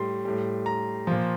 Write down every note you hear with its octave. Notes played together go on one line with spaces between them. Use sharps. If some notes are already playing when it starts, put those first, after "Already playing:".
Already playing: A2 G3 C6
A2 G3
A#5
A#2 F3